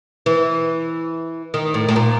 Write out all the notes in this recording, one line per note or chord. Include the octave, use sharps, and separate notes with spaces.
E3
D#3
A2
A2
A#2